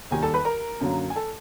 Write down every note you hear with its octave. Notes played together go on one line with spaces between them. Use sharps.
D#2 D#3 G3 G#5
A4 A5
B4 B5
A#4 A#5
F#2 D3 F#3 A#3
G#5
A4 A5